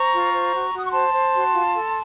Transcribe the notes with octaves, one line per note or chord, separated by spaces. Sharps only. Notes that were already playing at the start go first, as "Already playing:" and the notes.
Already playing: C5 A#5 C#6
F4
C5
F#4
F#4
D#6
C#6
C5 A5 C6
C5
F#4
F4
A4